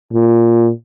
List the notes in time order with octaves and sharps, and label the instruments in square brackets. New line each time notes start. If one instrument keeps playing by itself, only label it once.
[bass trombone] A#2